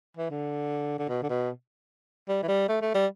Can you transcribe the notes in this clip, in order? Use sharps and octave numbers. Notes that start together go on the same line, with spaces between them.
E3
D3
D3
B2
D3
B2
G3
E3
G3
A3
A3
G3